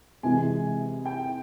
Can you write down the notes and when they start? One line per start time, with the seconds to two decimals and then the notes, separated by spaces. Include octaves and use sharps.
0.23 C3 E3 G#3 G#5
1.05 G5